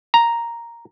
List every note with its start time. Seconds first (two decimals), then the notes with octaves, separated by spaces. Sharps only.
0.14 A#5